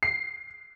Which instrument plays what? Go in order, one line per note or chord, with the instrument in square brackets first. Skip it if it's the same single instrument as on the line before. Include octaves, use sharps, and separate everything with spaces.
[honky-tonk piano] C7